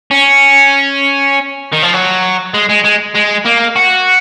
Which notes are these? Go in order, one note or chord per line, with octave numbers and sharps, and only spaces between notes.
C#4
D#3
F3
F#3
G#3
G#3
G#3
G#3
A#3
F#4